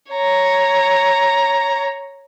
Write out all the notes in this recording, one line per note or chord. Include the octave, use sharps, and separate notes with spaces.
C#5 A#5